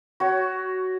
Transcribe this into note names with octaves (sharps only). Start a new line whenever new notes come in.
F#4 C#5